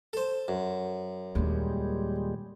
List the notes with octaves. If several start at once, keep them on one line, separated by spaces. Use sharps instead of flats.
A4 C5
F#2
D#2 A#2 G3 G#3 D4